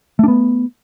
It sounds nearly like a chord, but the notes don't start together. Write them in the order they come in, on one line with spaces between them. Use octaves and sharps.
A3 D4 B3